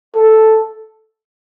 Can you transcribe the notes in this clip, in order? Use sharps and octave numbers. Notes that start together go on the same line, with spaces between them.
A4